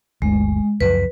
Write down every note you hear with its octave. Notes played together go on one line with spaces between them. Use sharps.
G1 D2 G#3
C#2 F#2 F3 B4